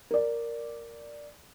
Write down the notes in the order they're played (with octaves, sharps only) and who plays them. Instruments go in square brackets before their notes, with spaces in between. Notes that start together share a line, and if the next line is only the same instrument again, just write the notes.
[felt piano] A#4 D5